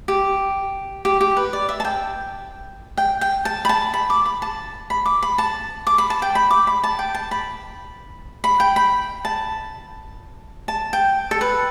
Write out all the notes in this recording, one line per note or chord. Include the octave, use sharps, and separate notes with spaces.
G4
G4
G4
B4
D5
E5
A5
G5
G5
G5
A5
B5
A5
B5
D6
B5
A5
B5
D6
B5
A5
D6
B5
A5
G5
B5
D6
B5
A5
G5
A5
B5
B5
G5
B5
A5
A5
G5
A4
B4